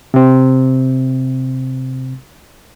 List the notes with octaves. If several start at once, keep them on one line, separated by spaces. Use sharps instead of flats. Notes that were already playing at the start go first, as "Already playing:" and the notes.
C3 C4